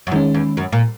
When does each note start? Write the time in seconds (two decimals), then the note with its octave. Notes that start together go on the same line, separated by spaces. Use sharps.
0.07 F#2
0.11 E2 D#3 G#3 C#4
0.34 E2
0.57 F#2
0.72 A#2